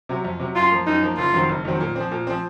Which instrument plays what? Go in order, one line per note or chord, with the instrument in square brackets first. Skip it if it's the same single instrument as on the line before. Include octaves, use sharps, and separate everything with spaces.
[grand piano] C3 F#3
F2
C3 F#3
[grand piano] F#2 [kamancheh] F4
[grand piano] F3 A#3
[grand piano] F#2 [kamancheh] D#4
[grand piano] F3 A#3
[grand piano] F#1 [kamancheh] F4
[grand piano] F2 D#3 F#3 C4
F#1
F2 D#3 F#3 C4
A#2
F3 C4
A#2
F3 C4